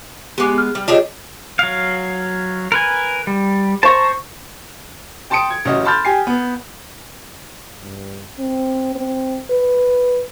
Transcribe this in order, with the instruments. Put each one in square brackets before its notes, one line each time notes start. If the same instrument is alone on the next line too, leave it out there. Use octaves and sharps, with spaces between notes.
[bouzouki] G#3 B3 [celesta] G4 D6
[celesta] F6
[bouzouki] G3
[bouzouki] D4 G4 G#4 [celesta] F4 C#5 D#5
[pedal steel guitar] F#3 F5
A#4 B4 G#5
G3
[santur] C5 C#6 [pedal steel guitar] A5 A#5
[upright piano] G5 A5 C6 D#6 C#7 D7
G#6
A1 C#3 F#3 D#5
A5 B5 C6 F6 G6 A6
G4 G#5 C7
B3
[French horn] G2
C4
C4
B4